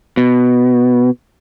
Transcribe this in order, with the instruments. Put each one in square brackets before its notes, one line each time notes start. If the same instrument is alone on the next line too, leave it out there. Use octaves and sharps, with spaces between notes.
[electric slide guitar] B2